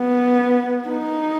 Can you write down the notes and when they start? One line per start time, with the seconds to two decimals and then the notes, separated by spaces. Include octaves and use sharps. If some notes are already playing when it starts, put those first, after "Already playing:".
Already playing: B3
0.88 D#4